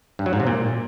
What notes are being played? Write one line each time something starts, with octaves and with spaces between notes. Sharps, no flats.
G2
F#3
G#2
C3
A#2